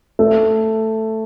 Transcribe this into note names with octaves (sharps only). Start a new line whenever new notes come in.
A3